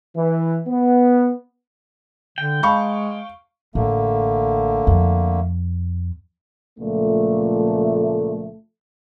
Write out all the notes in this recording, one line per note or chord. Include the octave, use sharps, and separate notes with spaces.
E3
B3
D3 G5
G#3 F5 A5 B5 C#6
A1 D3 A3 A#3
F2
C#2 A#2 F3 A3